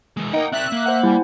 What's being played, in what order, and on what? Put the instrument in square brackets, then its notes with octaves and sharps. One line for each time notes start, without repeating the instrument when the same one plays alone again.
[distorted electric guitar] E3 G#3
[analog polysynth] A#3 D#4 [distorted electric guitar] F#5 G5
[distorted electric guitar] C4 D5 [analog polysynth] E5 F#6
[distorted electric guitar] A#3
[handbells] C5 F#5
[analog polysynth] G3 [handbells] E4 G#5